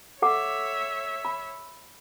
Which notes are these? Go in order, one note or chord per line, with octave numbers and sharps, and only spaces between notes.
A4 C#5 E5 F#5 D6
B5